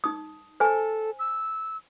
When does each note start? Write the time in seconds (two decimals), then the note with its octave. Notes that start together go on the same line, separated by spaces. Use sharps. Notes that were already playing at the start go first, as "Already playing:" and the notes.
0.04 D#4 D#6
0.60 A4 C5 G#5
1.19 E6